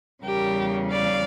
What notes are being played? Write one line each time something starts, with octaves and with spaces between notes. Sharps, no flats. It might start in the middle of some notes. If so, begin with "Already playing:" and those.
E2 C#3 G3 G4 A#4
D5 F5